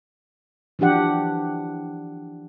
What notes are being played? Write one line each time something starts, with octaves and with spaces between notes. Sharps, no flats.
E3 F3 D4 G4 F#5